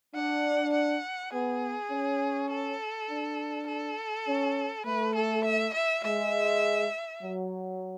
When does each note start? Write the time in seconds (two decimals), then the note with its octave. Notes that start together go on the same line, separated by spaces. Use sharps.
0.15 D4 F#5
0.73 F#5
1.33 B3 G#4
1.91 C#4
2.51 A4
3.09 D4
3.68 A4
4.27 C#4
4.85 A3 B4
5.15 A4
5.45 E5
5.74 E5
6.03 G#3 E5
7.21 F#3